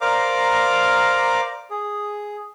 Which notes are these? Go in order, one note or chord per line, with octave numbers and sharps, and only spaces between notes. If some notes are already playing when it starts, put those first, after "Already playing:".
A#4 C5 D5 F5 A#5 D6
G#4